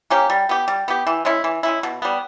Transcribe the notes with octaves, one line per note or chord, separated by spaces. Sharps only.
A#3 C#4 G4
G3
B3 G4
G3
B3 G4
E3
G#3 C#4 E4
E3
G#3 C#4 E4
B2
G3 B3